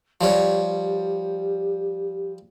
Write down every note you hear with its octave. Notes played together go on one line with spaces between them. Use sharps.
F3 G3 G4 C#5